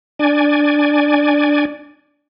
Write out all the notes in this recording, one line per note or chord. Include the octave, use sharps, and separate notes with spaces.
D4 D5 G#5